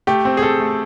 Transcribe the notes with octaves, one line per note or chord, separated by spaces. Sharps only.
A3 G4
C4
G#4
C4 A4
A3